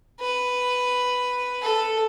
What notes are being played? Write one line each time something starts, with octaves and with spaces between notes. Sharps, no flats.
B4
A4